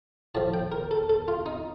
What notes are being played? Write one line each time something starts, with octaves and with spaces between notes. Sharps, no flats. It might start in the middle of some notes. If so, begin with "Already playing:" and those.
A2 F3 A5
G5
A#4
A4
A4
F4
D#4